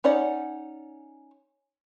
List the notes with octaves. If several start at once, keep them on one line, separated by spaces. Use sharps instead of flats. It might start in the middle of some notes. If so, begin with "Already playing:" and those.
C#4 D#4 C#5 D5 F#5